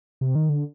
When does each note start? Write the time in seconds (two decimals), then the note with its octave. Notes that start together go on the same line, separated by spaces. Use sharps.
0.21 C3
0.35 D#3
0.49 D3